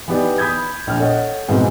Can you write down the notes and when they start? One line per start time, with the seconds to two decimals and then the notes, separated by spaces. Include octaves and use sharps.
0.08 E3 B3 D#4 G4 D5
0.38 B5 D#6 G6 G#6
0.87 A#1 F6
1.00 A4 C#5 D#5 F#5
1.48 F2 G#2 B2 E3 C4